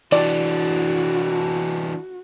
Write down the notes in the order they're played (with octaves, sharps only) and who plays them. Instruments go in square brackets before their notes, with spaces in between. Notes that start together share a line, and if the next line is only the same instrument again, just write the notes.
[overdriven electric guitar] E3 D4 [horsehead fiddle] F#4 [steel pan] D5